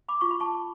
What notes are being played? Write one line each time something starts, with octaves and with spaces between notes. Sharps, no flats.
B5 D6
F4 C#6
B5
A5 C#6